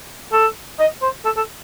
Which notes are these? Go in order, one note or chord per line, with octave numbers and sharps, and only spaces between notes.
A4
D#5
C5
A4
A4